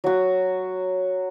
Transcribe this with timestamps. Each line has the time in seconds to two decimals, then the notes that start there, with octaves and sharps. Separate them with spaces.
0.04 F#3 F#4